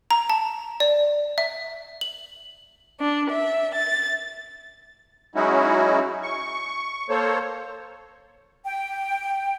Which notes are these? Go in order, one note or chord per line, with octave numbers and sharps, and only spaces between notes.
A#5
A5
D5
E5
F#7
D4
E5
A6
F#3 G#3 C#4 D#4 E4 F#4
C#6
A#3 A4 C5 C#5
G5